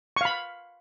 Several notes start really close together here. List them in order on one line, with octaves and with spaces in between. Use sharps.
C#6 F5 B5